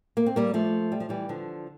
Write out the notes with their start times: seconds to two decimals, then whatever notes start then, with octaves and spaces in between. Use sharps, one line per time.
0.17 A#3
0.26 C4
0.36 G3 A#3
0.54 F3 A3
0.92 G3
1.00 F3
1.09 E3 G3
1.29 D3 F3